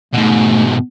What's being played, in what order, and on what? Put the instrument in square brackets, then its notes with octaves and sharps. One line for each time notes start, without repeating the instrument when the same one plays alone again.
[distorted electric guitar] G#2 B2 [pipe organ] A3